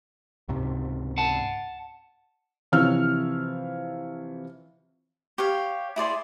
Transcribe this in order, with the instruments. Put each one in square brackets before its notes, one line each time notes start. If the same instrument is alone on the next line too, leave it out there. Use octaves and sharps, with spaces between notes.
[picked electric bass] C#2 G#2 C3
[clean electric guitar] F#5 A5
[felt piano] C3 E3 F3 C#5 E6 F6
[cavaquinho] G4 C#5 F5
E4 G#4 D5 C6